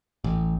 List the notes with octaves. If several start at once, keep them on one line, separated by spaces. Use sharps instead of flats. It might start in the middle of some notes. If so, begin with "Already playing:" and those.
A1